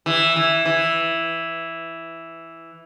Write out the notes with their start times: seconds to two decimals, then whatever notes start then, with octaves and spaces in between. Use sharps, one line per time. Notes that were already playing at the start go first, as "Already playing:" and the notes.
0.06 E3
0.36 E3
0.65 E3